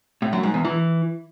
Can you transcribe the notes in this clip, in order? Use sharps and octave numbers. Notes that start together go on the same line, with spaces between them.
A2
F#2
G#2
E2
E3